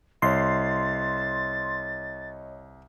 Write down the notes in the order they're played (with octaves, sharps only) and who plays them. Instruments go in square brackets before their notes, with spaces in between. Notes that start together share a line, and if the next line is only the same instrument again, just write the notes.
[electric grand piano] C2 [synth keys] C#5 D#5 [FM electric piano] C6 [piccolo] A6